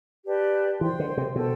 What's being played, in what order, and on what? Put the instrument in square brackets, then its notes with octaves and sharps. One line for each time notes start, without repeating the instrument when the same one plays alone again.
[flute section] G4 B4 D5 A5
[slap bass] E3 [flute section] C5 G5 C6
[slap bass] D3
C3
[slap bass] B2 [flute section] A4 C5 G5